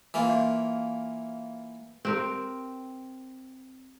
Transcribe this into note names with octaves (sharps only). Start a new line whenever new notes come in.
E3 A#3 F4
C4 G4 A#4